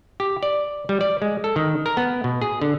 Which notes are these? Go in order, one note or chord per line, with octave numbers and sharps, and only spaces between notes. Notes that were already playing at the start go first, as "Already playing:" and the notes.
G4
D5
G3
D5
G#3
A4
D#3
A#4
B3
B2
G#4
D3